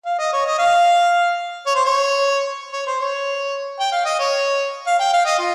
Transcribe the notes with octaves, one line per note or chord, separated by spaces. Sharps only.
F5
D#5
C#5
D#5
F5
C#5
C5
C#5
C#5
C5
C#5
G5
F5
D#5
C#5
F5
G5
F5
D#5
F4